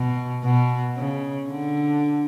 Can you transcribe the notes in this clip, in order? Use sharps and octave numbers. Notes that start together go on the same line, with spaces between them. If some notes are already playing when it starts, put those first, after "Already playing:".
Already playing: B2
B2
C#3
D3